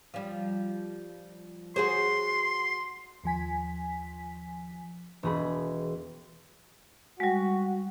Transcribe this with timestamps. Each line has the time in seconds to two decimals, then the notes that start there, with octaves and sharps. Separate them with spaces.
0.14 F3 G3
1.76 F#4 G#4 C5 C6
3.24 D#2 F3 G#5 B6
5.23 E1 G#4 B5
7.20 G3 G#3 F#4